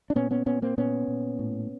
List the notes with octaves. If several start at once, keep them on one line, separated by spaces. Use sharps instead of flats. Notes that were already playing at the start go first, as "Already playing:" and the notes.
D4
A#2 B3 C#4
B3 C#4
A#2 B3 C#4
A#3 C4
A#2 B3 C#4
A#2
A2